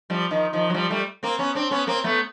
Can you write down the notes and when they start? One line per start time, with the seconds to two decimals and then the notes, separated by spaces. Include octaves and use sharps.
0.10 F3 G3
0.31 D#3 F3
0.53 D#3 F3
0.70 F#3
0.74 F3 G3
0.90 G3 A3
1.23 A#3 C4
1.39 B3 C#4
1.55 C4 D4
1.71 B3 C#4
1.87 A#3 C4
2.04 A3 B3